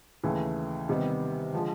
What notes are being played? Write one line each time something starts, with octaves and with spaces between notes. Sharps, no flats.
D#2 C#3 E3 A3
C3 D#3 G3 B3
D3 F3 G#3